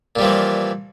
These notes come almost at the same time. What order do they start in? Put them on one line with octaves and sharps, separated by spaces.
A#2 G3 F3 E3